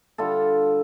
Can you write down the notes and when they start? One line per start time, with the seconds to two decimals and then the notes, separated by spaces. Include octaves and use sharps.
0.18 D3 G3 F4 A4